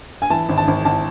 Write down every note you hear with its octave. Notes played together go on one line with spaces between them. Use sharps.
G#5
E3 A5
G#1
A5
G#1
G#1 A5